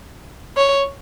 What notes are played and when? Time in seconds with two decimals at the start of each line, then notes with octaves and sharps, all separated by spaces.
0.57 C#5